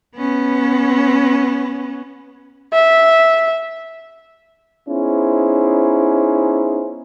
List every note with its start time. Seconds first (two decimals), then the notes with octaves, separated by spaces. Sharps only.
0.16 B3 C#4
2.73 E5
4.88 B3 C#4 D#4 E4 G#4 C5